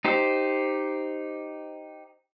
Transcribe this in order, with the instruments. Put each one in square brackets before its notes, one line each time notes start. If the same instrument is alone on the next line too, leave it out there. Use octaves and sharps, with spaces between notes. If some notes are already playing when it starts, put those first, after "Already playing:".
[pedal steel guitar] D#4 G4 C5